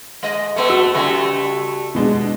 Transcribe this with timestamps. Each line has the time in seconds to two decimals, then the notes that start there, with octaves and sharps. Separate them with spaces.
0.23 G#3 D#5
0.56 A3 B3
0.70 F#4 E6
0.94 C#3 G3 A3
1.95 B2 G#3 D4